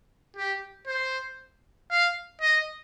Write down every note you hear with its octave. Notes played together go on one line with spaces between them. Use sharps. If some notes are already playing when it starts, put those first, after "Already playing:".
G4
C5
F5
D#5